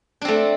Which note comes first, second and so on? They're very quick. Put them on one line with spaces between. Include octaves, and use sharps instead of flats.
D4 C4 A3